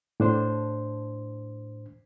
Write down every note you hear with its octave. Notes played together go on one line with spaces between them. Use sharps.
A2 D4 C5